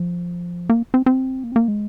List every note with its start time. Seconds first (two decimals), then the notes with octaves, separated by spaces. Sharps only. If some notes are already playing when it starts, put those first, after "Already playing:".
Already playing: F3
0.69 A#3
0.94 C4
1.06 C4
1.44 A#3
1.52 C4
1.56 A#3
1.68 G#3